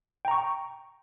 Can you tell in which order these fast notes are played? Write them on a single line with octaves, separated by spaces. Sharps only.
G5 A#5 C#6